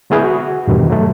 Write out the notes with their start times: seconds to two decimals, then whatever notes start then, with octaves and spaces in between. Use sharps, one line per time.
0.10 D3 G#3 B3 E4 G#4 B4
0.24 F#4
0.67 E2 G2 B2 D#3
0.90 F#3 A3